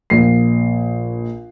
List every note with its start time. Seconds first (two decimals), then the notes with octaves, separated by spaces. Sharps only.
0.10 A#1 C7